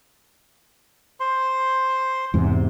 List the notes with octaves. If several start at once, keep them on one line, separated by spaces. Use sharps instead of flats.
C5 C6
E2 G#2 C3